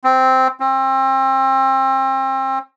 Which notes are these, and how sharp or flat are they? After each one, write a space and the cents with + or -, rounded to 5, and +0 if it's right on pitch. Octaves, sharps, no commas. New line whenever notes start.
C4 -5
C4 +30